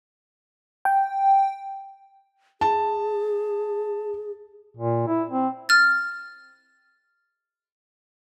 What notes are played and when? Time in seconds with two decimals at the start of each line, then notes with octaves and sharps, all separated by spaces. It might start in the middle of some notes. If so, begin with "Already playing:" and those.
0.85 G5
2.61 G#4 A5
4.77 A#2
5.07 E4
5.31 C4
5.69 F6 A6